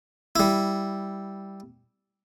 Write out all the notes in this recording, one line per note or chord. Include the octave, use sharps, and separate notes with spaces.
G3 E4